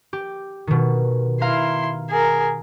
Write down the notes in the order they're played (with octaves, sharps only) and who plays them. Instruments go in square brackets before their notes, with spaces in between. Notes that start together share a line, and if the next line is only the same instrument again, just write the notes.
[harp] G4
B2 D#3
[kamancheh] E4 C6 [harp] F5 A#5
[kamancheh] G#4 A#4